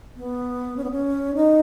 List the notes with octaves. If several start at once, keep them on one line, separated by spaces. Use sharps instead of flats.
B3
C#4
B3
C#4
D#4